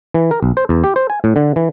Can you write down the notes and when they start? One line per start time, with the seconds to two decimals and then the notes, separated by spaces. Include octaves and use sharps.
0.14 E3
0.31 A#4
0.43 B1
0.57 C5
0.69 E2
0.84 G4
0.96 C5
1.10 G#5
1.24 A2
1.36 D3
1.56 E3